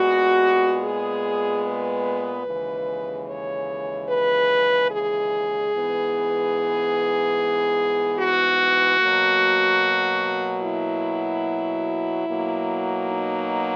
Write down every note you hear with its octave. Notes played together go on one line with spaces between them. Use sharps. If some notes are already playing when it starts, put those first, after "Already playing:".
Already playing: A#2 G#3 B3 F#4
G#4
B4
D#2 C#3 E3 G#3
C#5
B4
G#4
G#2 E3 B3
F#4
B2 F#3 A#3
E4
B2 F#3 A#3
D#4